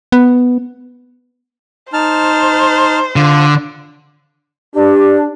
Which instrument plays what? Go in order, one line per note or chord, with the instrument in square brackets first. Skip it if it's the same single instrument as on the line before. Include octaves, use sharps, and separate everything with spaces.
[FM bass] B3
[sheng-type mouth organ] D#4 A5 F6 [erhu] C5
[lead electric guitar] D3 [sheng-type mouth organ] F4
[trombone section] D4 [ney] G4